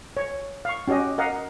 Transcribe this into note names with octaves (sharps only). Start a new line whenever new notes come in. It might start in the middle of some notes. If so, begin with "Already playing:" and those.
C#5
F5 C#6
C#4 F#4 G4 D#5
A#4 D#5 F5 F#5